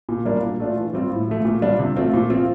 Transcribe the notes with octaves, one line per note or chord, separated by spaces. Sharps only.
A#2
G3 A#3 D4 F4
A#2
A3 D4 F4
E3
G3 C4 F4
A2
F3 A3
A#2
G3 D4 F4
C3
F3 A3 C4 F4
A#2
F3 C4 F4